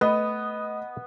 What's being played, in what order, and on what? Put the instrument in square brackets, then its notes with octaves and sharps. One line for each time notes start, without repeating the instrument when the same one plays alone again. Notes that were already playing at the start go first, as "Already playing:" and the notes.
[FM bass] A3 [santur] B3 [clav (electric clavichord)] B4 [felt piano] D#5